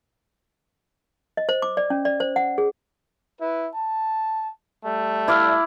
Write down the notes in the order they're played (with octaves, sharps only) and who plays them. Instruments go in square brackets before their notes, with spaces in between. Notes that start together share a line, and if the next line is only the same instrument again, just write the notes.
[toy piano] D#5
C5
D6
D5
C#4
D5
C5
F#5
G#4
[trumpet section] E4 B4
A5
G3 A3
[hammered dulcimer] E4 D5 F5